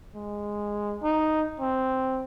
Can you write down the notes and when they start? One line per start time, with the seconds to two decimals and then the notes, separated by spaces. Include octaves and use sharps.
0.15 G#3
1.03 D#4
1.60 C4